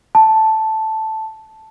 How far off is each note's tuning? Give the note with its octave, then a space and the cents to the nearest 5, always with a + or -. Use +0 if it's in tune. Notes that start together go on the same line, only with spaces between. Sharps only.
A5 -5